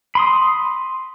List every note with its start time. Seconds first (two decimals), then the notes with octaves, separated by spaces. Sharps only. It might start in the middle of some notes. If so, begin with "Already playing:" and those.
0.15 B5 C6 D#6